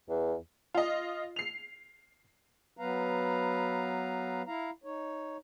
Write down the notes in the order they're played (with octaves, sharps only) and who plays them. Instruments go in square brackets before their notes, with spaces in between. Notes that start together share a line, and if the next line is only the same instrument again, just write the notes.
[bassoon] E2
[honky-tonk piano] F4 D#5
C7 F7
[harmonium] F#3 B3 B4 F5 A#5
E4 F5 A#5
D#4 C#5